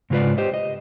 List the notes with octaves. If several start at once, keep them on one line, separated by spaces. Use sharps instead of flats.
G#2 C#3 G#3 F4 B4 D5
G4 C5 D#5
D#5